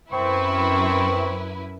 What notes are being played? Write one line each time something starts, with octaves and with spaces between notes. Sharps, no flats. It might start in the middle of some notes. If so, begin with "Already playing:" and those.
F#2 C4 E4 B4 C#6